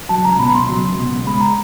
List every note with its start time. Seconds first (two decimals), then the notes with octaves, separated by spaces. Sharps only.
0.09 F#3 A5
0.25 C#2 A#5
0.39 B2 B5
0.54 C#2 C6
0.69 F#3
0.83 C#2
0.99 B2
1.13 C#2
1.27 G#3 B5
1.41 A#5